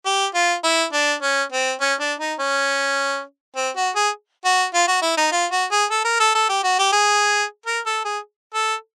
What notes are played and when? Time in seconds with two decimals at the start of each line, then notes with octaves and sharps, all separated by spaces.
0.06 G4
0.34 F4
0.64 E4
0.93 D4
1.22 C#4
1.52 C4
1.81 C#4
2.00 D4
2.20 D#4
2.39 C#4
3.56 C4
3.76 F#4
3.95 G#4
4.45 F#4
4.74 F4
4.88 F#4
5.02 E4
5.17 D#4
5.32 F4
5.51 F#4
5.71 G#4
5.90 A4
6.05 A#4
6.20 A4
6.35 A4
6.49 G4
6.64 F#4
6.79 G4
6.92 G#4
7.66 A#4
7.86 A4
8.05 G#4
8.54 A4